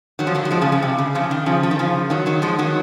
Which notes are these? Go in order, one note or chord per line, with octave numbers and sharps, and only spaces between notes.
D#3 F#3
F3
D#3 F#3
F#3
F3 G#3
C#3 F3
C#3
C3
C#3
C#3 F3
D#3
C#3 F3
F3
D#3
C#3 F3
D#3 F#3
D#3 F#3
F3 G#3
D#3 F#3